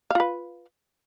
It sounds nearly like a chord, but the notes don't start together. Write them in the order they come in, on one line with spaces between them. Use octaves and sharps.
F5 F4 B4